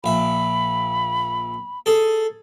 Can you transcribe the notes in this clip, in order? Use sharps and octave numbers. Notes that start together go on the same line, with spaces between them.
A#1 E5 B5
G#4 A4